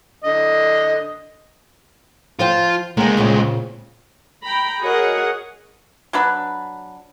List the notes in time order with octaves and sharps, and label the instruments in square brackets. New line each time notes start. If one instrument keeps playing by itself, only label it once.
[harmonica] D3 D#5
[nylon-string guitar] F3 C5 G5 [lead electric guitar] F4
[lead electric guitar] C2 G#3 [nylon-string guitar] A#3 G5
[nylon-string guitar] A#2 C#3 C4
[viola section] G5 A#5 B5
F#4 G#4 A#4 C#5 D#5 F#5
[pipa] F#3 D4 B4